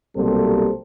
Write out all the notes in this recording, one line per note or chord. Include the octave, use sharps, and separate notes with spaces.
B1 C3 G3 A#3 C4 A4